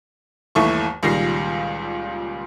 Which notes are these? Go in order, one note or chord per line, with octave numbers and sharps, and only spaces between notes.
G1 D#2 E3 A3 E4 C#6
C#2 A#2 D#3 G3 A#6 C7